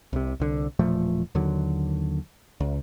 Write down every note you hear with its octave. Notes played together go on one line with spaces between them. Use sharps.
C2 C3
C2 D3
E1 A#2 F3 A3
D#2 D3 F#3
C#2